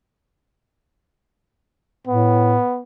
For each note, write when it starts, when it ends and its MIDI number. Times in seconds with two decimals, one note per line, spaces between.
2.07 2.57 45
2.07 2.82 59